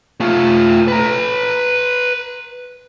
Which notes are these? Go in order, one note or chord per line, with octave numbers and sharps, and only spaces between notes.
A3 F4
B4 A#5